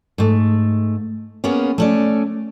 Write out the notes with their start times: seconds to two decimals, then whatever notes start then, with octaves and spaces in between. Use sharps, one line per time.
0.18 G#2 A3
1.44 A#3 B3 C#4 G#4
1.78 A3 C#4 D5